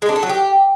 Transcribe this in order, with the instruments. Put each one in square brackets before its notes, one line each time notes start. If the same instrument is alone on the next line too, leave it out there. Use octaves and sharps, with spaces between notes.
[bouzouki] G#3
D4
A4
F#3
G4